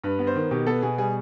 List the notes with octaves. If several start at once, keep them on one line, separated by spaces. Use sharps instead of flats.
G2 B4
B3
C5
D#3
B2 G4
B3 A4
B2 G#4
G3 G#4